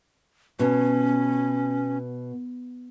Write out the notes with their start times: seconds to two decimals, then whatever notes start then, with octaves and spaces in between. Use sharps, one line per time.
0.59 B2 C#4